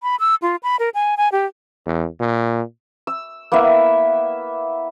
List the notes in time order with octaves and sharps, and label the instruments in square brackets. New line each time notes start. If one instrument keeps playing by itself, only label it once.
[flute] B5
E6
F4
B5
A#4
G#5
G#5
G4
[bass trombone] E2
A#2
[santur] E6
A#3 B3 E4 E5